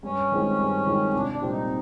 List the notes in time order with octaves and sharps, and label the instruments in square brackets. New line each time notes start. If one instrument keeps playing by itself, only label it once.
[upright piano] G2 [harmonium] C#4
[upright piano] D#3 G#3 C4 F4
G2
D#3 G#3 C4 F4
[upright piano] C2 [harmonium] D4
[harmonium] D4
[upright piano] A#2 G3 C4
[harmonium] D#4